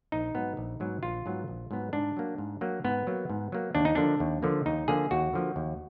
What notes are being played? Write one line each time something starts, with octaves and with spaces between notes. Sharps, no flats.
A#1 D#4
G#2 F#3 B3
A#1
G#2 F#3 B3
A#1 F4
G#2 F#3 B3
A#1
G#2 F#3 B3
G#2 D4
F#3 A#3
G#2
F#3 A#3
G#2 B3
F#3 A#3
G#2
F#3 A#3
D#2 D4
D#4
D3 F3 A#3 D4
D#2
D3 F3 A#3
D#2 D#4
D3 F3 A#3 G#4
D#2 F#4
D3 F3 A#3
D#2